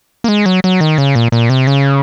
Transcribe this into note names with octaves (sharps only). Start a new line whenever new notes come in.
A#3
G#3
F#3
F#3
D#3
C#3
A#2
A#2
C3
C#3